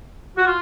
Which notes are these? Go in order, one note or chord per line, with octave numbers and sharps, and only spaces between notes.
F#4
F4